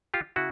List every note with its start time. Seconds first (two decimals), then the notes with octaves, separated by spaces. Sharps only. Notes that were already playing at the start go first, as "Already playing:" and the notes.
0.14 F4 G4
0.36 C#3 E4 F#4